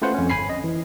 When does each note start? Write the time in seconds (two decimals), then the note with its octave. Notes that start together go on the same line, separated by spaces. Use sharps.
0.02 A3 C#4 F4 B4 C5 F#5
0.14 F2 C#4
0.29 G1 G#5 B5 C7
0.49 D#5
0.64 E3